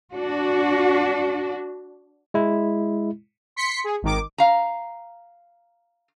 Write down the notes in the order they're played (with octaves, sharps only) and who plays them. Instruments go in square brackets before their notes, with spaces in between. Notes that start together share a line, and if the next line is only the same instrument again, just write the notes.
[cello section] D4 F#4
[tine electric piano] G#3 E4
[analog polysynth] C6 B6 C#7
G#4
G#1 D#3 D6
[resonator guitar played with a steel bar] F5 A#5